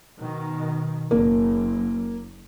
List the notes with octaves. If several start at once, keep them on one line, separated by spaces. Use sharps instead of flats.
B2 D#3
F#1 A#3